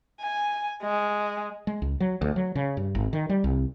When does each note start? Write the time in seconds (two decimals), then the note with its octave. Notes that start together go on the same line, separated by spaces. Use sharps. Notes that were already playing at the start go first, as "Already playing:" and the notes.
0.21 G#5
0.82 G#3
1.67 G#3
1.82 C#2
2.00 F#3
2.22 D2
2.36 F#3
2.55 C#3
2.77 G2
2.95 G#1
3.13 D#3
3.29 G3
3.44 C2